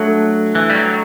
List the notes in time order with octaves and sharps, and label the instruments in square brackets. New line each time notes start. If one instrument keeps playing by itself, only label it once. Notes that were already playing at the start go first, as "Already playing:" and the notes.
Already playing: [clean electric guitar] F#3 [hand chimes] A3 D4 A4 E5 A5
[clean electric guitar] E3
G3
F#3